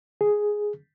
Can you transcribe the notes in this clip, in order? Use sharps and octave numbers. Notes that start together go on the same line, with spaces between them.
G#4